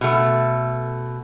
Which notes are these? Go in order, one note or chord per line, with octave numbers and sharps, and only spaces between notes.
B2 A3